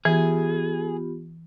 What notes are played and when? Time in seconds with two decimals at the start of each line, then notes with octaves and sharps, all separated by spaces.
0.05 E3 B3 F4 G4 G#4